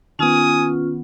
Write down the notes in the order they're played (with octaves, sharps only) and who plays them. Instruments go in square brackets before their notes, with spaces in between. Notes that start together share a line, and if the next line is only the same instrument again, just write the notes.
[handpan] D#3 B3 [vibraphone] C#4 F4 [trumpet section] G#5 D#6